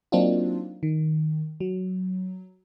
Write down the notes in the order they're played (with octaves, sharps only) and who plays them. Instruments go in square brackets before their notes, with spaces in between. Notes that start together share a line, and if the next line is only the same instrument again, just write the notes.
[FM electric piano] F#3 A#3 C4 D4 D#4 F4
D#3
F#3